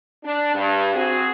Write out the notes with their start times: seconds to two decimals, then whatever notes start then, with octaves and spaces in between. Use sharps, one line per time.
0.24 D4
0.55 G2
0.94 C4 F#4 G#4